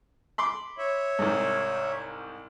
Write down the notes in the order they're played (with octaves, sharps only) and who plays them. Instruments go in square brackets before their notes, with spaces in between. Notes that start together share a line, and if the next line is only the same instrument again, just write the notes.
[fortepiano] B5 C6 D6
[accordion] C#5 E5
[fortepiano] C2 G#2